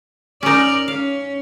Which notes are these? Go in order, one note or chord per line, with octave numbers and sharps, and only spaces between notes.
C#4 D#4 A#4 D5
C#4 F5